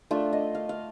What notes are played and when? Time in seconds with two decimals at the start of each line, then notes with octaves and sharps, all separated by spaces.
0.11 A3 D4 F4 E5
0.33 D#5
0.55 F5
0.69 F5